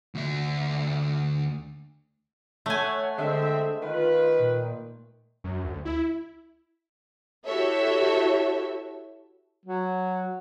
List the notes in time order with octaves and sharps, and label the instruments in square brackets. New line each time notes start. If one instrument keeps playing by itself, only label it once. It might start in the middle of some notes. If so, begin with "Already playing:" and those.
[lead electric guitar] D2 E5
[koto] A3 G#5 [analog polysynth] C#5 E5 F#5
[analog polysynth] D3 [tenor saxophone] G#3 [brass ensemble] C4 E5
[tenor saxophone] D#3 [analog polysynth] F4 [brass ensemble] B4
[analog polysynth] A#2
[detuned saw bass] F#2
D2
E4
[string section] E4 F#4 G4 A4 C#5 E5
[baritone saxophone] F#3